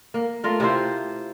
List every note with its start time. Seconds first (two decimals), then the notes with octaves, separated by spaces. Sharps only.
0.14 A#3
0.44 A3 F4 A#4
0.60 C3 E4 F4 C5